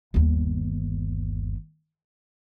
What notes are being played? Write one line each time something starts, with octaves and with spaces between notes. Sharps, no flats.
G1 D#2